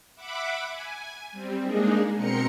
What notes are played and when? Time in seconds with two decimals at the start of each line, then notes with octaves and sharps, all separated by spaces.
0.15 E5 F#5 B5 D6
0.71 G#5
1.31 G3 C4
1.61 G#3 A#3 D4 D#4 G#4
2.15 B2 C4 A#4 A#5 C6 C#7